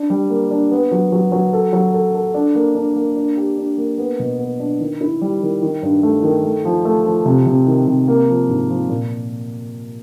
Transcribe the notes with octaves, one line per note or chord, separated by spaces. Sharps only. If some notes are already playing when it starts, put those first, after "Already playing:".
Already playing: D4
G3
A#3
D4
B3
F#3
F#3
F#3
A4
F#3
A4
A4
D4
A#3
D4
A#3
D4
G4
D4
A#3
B3
B2
B3
D4
D#3
E4
G3
D#3
D#3
G2
A3
D#3
A3
F3
A3
F3
C3
C3
D#3
C3
A#3
F3
G#2
F3
A#2